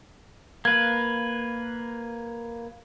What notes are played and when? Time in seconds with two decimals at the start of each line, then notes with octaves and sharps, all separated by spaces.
0.65 A#3 B4 G#6